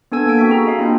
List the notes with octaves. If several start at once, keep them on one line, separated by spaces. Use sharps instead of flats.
B3 D4 A4 G#5 E6 G#6
A#3 A4 E6 D7
C4 F#4 E5 B6
F#4 G#4 G#5 A#5
D#5 F5
A#3 D4 E4 F4 G5